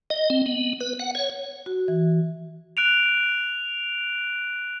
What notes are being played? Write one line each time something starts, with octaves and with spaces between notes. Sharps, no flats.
D#5
C4
B3
B4
F#5
C#5
F#4
E3
F#6 D7 F7